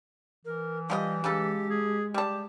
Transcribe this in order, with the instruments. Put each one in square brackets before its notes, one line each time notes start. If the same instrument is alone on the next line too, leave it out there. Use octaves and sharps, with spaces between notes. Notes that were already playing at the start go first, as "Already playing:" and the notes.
[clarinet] E3 [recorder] A#4
[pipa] F3 G4 D#5 [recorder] G3
[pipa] C#3 D#4 A4 [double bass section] G#3 [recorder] G4
[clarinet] G#4
[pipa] G3 A5 [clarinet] G4